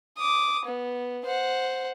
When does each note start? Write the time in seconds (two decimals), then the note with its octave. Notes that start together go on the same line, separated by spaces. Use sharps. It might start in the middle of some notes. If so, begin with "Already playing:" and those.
0.17 D6 D#6
0.65 B3
1.25 C5 F#5